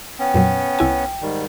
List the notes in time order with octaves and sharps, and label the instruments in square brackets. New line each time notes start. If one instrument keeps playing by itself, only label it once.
[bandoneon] B3 C#4 [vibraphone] G5
[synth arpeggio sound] F2 A#2 F#3
C2 E4 G#5
[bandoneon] G#2 D#3 G3